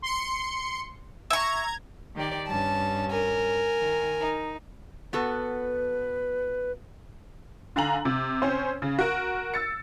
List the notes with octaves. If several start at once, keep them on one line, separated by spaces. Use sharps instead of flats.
C6 C#7
E5 A#5 C#6 G#6
D#3 G4 D5
G2 C#4 A5
A#4 G#5
D#3
D#4
B3 F#4 A4 B4
D3 F5 G#5 A#5 F#7
C3
C4 C#4 C5
C#3
F#4 A#4
E6 A6 C#7